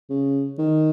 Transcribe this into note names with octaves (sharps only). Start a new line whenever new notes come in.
C#3
D#3